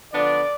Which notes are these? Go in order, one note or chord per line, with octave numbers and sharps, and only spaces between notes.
D3 F3 B3 D4 D5